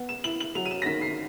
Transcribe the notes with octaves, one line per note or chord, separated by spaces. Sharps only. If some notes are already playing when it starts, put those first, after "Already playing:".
Already playing: B3
E7
E4 F#7
F#7
F#3 F7
D#7
E7
A#6
D#3 B6
C7